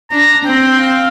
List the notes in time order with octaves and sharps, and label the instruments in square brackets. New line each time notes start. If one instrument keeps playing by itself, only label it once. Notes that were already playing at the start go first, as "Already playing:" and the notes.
[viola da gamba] D4 [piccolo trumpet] A#5
[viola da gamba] C4 [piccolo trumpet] G5
[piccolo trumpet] F5